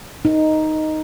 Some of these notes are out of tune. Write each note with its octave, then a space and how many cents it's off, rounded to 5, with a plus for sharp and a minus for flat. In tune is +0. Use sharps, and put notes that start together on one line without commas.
D#4 +0